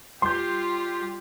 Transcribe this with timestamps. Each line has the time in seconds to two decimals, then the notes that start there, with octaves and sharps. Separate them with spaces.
0.22 G3 F4 G4 C6 G6